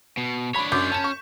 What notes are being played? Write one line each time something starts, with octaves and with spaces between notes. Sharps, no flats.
B2
D4 C#5 B5 B6
F#2 D6 G6
C#4 A5 E7
C#6